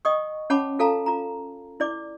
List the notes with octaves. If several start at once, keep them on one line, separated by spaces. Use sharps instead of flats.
D#5 G5 C#6 D#6
C#4 C#5 F#5 A5 B5 D6
F4 A4 F5 A5 A#5
F4 A#5
E4 D5 D6